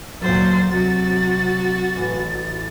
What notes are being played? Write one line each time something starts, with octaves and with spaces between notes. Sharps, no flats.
D2 A#2 F#3 C5 D5 A6
C3 F#3 F#4
A1 E3 E4 D6